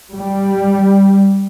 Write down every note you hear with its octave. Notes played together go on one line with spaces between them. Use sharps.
G3